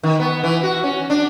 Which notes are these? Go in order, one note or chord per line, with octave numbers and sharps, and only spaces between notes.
D#3
B3
E3
F#4
C#4
D4